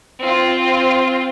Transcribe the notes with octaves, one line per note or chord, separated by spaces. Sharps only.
C4 F4